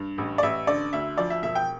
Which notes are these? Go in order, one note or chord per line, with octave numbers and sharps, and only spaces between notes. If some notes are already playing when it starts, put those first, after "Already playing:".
Already playing: G2
A1
D5
A1 E5
D3 D5
D2 E5
F3 D5
E5
E1 E5
G5